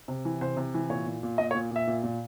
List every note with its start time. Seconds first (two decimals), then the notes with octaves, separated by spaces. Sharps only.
0.08 C3
0.25 E3
0.41 C3 C5
0.57 C3
0.74 E3
0.90 A#2 C#5
1.06 A#2
1.23 A#2
1.38 A#2 D#5
1.51 C#5
1.55 A#2
1.71 A#2 E5
1.87 A#2
2.03 A#2